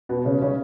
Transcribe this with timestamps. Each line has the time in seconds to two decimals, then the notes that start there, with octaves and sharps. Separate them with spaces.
0.09 B2 B3
0.25 C#3 C#4
0.42 C#3 C#4